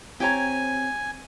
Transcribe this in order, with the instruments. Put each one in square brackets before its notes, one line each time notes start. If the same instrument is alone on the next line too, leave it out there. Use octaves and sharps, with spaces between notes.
[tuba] C4 [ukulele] G4 C#5 A#5 [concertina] G#5